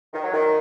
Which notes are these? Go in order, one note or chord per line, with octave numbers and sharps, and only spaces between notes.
D#3
F#3
D#3